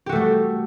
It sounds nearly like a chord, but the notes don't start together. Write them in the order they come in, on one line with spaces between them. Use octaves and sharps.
G4 F#4 A3 G3